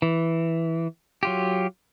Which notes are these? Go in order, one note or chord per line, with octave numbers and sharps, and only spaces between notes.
E3
F#3 F4 G4